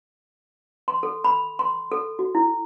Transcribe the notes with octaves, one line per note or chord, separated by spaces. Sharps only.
C6
A4
B5
C6
A4
F#4
E4